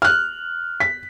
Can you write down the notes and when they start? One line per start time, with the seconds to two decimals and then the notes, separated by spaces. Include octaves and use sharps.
0.02 F6 F#6
0.80 B6